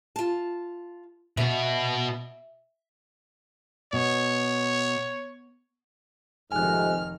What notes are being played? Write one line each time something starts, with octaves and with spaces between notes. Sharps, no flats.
F4 A5
B2 F#4 E5
B2 C#5
F1 F2 G#2 C3 D#3 G#5 F6 F#6